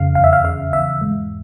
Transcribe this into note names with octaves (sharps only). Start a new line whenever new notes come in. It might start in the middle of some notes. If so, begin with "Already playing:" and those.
Already playing: F2 C#3 F5
E2 F5
E5
F5
C#3 F5
E2 E5
G#2